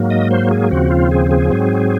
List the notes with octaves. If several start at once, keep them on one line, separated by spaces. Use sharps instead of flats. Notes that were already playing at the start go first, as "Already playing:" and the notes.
Already playing: G#2 F#3 A#3
D#5
C5
G#4
D#2 C#3 F3 C4 F#4
F4
G#4
G#4
G#2 F#3 C4